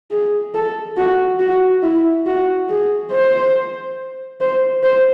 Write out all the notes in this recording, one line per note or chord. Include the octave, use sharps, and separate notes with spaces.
G#4
A4
F#4
F#4
E4
F#4
G#4
C5
C5
C5